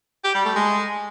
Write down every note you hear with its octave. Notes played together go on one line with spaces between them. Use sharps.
G4
G3
A3
G#3